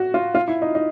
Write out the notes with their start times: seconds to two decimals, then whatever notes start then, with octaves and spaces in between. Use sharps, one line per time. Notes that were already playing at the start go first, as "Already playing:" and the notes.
Already playing: F#4
0.14 F4
0.35 F4
0.48 E4
0.62 D#4
0.75 D#4